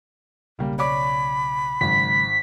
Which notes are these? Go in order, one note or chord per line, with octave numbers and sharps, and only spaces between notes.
B1 C#3 G3 A#3
C#5 D5 B5 D6
G#1 C#3 F#3 G#3 B6